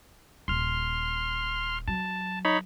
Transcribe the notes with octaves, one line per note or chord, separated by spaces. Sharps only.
D#1 C6 F6
F#3 A5
D#4 C#5 B5